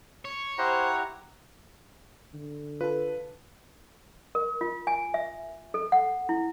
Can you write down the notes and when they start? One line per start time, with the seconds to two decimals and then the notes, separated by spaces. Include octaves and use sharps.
0.25 C#5
0.58 E4 G4 C5 F#5 A#5
2.34 D3
2.81 F4 A4 B4
4.35 A#4
4.61 F4
4.87 G#5
5.14 E5
5.74 A4
5.92 F#5
6.29 E4